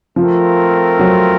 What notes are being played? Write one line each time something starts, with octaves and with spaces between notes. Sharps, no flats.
F3 A3 C4 F4 A#4
F#3